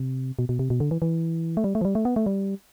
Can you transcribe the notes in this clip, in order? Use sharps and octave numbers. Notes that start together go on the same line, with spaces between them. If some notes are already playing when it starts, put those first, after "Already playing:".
Already playing: C3
B2
B2
C3
B2
D3
E3
E3
A3
G3
A3
F3
G3
A3
B3
A3
G3